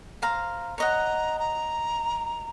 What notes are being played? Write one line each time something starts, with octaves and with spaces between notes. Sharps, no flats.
C5 F5 A#5
C#5 D#5 F#5 A#5
A#5